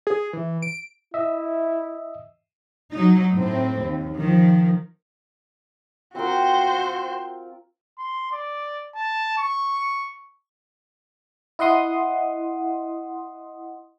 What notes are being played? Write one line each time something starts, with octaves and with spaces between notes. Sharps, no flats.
G#4
E3
D7
E4 D#5 E5
F#3 D#4
A2 C4
D#2
D#3 F3
C4 F4 F#4 A#4 C5
C6
D5
A5
C#6
E4 D#5 F#5 C6 D#6